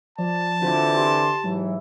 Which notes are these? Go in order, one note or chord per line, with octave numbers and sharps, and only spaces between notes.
F3 D5 A5
D3 E3 C4 F4 F#4 C5
G4 C6
G#2 E3 F#3